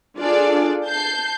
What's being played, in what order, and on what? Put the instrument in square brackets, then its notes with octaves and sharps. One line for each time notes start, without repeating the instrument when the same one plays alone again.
[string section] D4 F4 G#4 A4 D5
A5 G6 C7